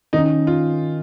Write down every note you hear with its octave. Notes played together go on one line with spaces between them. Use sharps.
D#3 C#4 D#4
F4